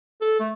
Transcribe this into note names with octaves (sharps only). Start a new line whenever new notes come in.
A4
A3